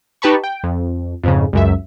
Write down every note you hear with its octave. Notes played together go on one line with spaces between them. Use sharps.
D#4 G4 B4 A5 B5 C#6
G5
F2
F2 G#2 C#3
C#2 F#2 E5